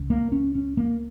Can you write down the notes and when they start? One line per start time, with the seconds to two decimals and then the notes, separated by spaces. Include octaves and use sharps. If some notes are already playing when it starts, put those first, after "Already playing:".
Already playing: C#2 C#3
0.10 A#3
0.32 C#4
0.55 C#4
0.77 A#3